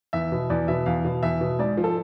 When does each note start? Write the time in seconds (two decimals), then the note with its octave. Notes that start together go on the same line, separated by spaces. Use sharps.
0.13 E2 E5
0.32 B2
0.50 E2 D5
0.68 B2 E5
0.86 E2 F5
1.05 B2
1.23 E2 E5
1.41 B2
1.59 G#2 D5
1.77 F3
1.84 A4